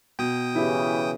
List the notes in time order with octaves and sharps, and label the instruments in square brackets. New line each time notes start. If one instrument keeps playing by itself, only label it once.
[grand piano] B2 [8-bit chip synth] G5 D#6
[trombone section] C#3 E3 [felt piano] E4 G4